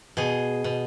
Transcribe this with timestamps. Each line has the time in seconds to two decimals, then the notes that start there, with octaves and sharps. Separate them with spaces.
0.17 B2 G#4
0.64 B2